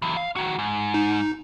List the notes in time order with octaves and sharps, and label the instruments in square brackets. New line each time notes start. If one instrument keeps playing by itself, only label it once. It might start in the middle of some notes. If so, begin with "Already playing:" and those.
[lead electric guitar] E3 F#3
F5
D#3 F#4
G#2
[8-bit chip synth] D#4